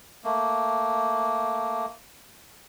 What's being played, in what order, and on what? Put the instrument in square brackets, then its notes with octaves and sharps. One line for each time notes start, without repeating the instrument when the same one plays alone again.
[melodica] A3 A#3